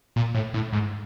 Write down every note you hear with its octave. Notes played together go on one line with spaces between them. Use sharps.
A#2
A2
A2
G#2